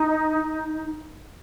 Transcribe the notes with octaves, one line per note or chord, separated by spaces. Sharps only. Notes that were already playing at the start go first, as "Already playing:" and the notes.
Already playing: D#4